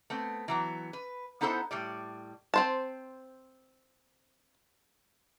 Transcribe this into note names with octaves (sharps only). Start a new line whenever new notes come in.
A3 B3 C4
E3 F#3 B3
B4
B3 D#4 E4 A4 C5 F#5
A2 G3 D5
C4 C5 A5